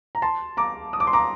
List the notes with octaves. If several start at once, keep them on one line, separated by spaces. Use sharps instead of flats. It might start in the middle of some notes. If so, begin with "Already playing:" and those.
A#5
A5 C6
A#5 D6
D#6
D6
C6
A#5 D6